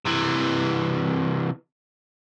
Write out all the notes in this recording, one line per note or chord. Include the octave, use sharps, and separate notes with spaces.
C3 E3